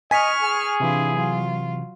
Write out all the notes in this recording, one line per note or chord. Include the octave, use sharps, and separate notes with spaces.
D#5 G#5 C#6 F6 B6
G#4
C3 E3 D4 E4 F4
F#3 F4